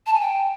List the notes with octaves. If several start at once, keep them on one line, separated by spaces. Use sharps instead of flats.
A5
G#5
G5